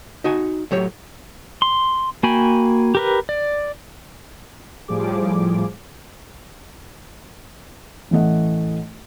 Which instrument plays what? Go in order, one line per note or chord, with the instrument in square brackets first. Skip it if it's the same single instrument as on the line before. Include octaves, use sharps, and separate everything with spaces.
[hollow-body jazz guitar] D#4 F#4 G#5
A2 F#3 G4 C#5
[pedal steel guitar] C6
A#3 F#4 G5 G#5 B5
G4 A#4 B4
D5
[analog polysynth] A2 F3 G3 G#4 D6
[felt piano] A1 E3 A3 D#5 F#5